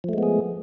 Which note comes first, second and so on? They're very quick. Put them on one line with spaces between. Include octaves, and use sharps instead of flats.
F3 A3 G#3 B3 G#4